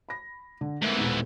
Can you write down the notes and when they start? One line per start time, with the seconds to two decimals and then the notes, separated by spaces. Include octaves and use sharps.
0.09 B5 A#6
0.61 D3
0.82 G#2 E3 A3 A#3 C4
0.97 D#1 B2